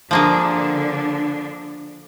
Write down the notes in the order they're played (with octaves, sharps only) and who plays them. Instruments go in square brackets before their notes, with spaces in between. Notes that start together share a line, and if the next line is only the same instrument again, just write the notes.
[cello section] D3 D4 [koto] F3 A#3 G#4